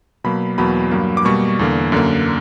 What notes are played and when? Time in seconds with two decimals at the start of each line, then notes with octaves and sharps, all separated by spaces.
0.24 B2 F#3 A#3 B5
0.58 E2 B2 F#3 A#3 B5
0.91 G2 F#3 A#3
1.17 D6
1.25 B2 G3 A#3 C#6
1.59 E2 D3 A#3
1.92 F#2 D3 A#3